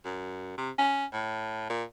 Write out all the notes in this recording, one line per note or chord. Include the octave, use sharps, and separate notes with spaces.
F#2
C3
C#4
A2
A#2